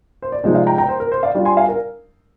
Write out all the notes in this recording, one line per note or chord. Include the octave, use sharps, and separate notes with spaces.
C5
D5
C3 F3 G#3 D#4 C5 D#5
D5 F5
G5 A#5
G5 A#5
C5
A#4
C5
D5 F5
G3 D4 F4
G#5 C6
F5 G#5
A#4